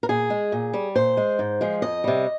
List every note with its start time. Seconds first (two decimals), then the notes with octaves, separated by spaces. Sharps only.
0.03 A#4
0.09 A#2 G#4
0.30 G#3
0.52 A#2
0.73 G3
0.95 A#2 C5
1.17 G#3
1.39 G#2
1.61 F3 G#3
1.82 F2 D#5
2.04 C3 G3